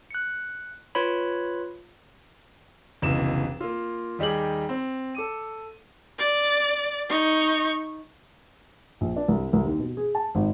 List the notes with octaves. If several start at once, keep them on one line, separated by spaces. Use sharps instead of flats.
F#6 C#7
F4 B4 C#5 B5
F1 C#2 B2 E3 E7
A#3 F4
D#2 G3 D#4 G4 G#4 F#7
C4
A4 D6 D#7
D5
D#4 C#6
A#1
D4
C2
C2
D#2
B2
G#4
A5
G#1